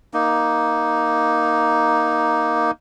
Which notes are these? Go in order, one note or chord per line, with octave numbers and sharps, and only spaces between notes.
A#3 D#4